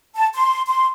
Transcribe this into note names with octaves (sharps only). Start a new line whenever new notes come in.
A5
C6
C6